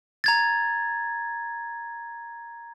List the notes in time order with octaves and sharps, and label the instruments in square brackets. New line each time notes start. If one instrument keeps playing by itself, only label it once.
[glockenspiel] A#5 G#6 A6